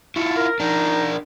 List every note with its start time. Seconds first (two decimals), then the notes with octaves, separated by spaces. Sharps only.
0.16 E4 F4 A5 C#6
0.37 A#4
0.60 D4 D#4 A#4